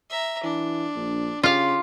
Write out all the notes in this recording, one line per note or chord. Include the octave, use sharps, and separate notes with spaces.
E5 A#5
E3 D4
A#1
C#3 F4 G4 F5